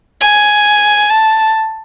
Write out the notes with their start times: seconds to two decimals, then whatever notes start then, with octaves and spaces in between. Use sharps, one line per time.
0.21 G#5
1.10 A5